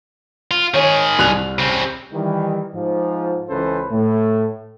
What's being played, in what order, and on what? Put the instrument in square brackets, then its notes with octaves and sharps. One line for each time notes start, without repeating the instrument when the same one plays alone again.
[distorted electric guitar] F4
[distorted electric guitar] D#3 G#4 [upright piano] C#5
[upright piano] C2 F#6 F7
[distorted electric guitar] C#3 C4
[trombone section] D#3 E3 G3
G#2 F3
C#2 E3 C#4 A4 B4 C5
A2 A3